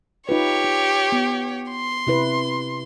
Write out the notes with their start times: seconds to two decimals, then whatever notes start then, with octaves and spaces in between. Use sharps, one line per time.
0.29 D#4 F4 G4 B4 C#5
0.64 D#4
1.12 B3
1.70 C6
2.07 C3 E4 B4